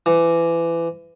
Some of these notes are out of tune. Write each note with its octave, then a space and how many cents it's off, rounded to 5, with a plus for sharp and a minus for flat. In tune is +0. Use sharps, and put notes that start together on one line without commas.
E3 +25